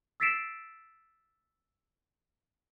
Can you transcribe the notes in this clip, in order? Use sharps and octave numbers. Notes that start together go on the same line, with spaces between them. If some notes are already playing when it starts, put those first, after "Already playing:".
E6 A6 B6 C7 D7 E7